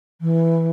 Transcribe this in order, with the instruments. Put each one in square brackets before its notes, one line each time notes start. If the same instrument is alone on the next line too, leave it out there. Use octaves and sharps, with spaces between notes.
[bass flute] E3